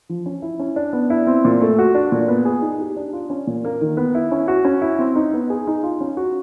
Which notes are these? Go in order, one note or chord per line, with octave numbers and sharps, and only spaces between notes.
F3
C#4
E4
C#4
D4
B3
E4
C4
A#2
A3
F#4
D4
A#2
B3
G#4
D#4
G4
D4
F4
C#4
A#2
A#3
D#3
B3
E4
C#4
F#4
C#4
E4
C4
D#4
B3
G#4
D#4
F4
C#4
F#4